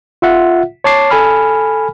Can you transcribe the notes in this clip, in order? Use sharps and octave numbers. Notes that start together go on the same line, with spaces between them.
F4 E5 F#5
C#5 A5 D6 C7
A4 G#5 B5 F6